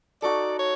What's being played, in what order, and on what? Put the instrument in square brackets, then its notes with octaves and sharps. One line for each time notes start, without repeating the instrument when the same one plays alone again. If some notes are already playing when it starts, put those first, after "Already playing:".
[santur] D#4 F#4 A4 [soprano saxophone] D5
[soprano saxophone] C#5